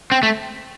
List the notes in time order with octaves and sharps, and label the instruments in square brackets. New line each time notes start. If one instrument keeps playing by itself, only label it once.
[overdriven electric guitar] C4
A3